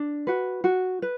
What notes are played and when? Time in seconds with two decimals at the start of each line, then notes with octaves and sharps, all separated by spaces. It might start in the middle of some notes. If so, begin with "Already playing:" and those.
Already playing: D4
0.27 F#4 B4
0.64 F#4
1.02 B4